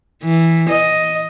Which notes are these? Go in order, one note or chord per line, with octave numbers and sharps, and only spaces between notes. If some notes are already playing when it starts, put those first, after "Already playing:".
E3
D#5